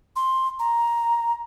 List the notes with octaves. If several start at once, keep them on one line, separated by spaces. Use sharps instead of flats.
C6
A#5